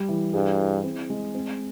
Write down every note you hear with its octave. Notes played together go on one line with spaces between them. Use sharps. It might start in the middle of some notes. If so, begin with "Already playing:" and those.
Already playing: G3
E3
G2 G#4
E4
C4
G#3
C4